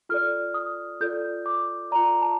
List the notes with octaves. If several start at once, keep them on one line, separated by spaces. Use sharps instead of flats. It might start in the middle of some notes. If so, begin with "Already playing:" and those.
F4 A4 D5 F6
D#6
F4 A4 D5 G6
D6
F4 A4 D5 A#5
A5